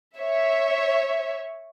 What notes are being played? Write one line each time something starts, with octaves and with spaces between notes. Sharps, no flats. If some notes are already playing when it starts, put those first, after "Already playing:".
C#5 E5